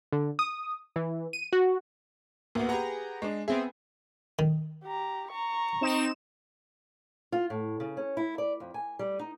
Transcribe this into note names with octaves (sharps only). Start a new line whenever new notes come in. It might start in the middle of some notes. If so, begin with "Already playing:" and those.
D3
D#6
E3
D#7
F#4
D2 A#3 B3
G4 G#4 B4 F#5 A#5
G#3 D4
B3 C4 G#4 E5
D#3
G4 A#5
A#5 C#6
C4 D#4 E7
F4
A2
C#3
C#4
E4
D5
F2
G#5
G3
D#4